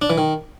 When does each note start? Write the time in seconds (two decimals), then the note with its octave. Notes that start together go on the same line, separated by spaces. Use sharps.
0.02 D4
0.10 E3
0.18 D#3